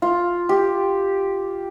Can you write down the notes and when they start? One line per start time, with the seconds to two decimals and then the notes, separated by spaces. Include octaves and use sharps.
0.02 F4
0.49 G4